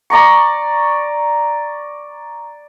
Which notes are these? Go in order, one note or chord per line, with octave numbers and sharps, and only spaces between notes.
D5 A#5 C#6